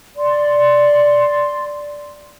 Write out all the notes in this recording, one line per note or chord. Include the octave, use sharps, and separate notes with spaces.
D5 C6